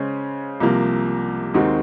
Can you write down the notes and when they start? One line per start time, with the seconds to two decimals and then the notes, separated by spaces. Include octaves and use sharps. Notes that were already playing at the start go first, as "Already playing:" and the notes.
Already playing: C#3 G#3 C#4 C5
0.60 C2 C3 F3 A#3
1.54 D#2 D#3 G#3 C4 F#4